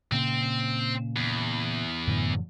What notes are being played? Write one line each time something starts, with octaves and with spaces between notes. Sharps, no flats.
A#2 C#3 A#3 C4
E2
F#2 A2 D3